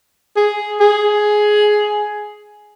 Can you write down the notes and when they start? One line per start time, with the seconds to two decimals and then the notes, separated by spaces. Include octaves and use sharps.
0.37 G#4
0.81 G#4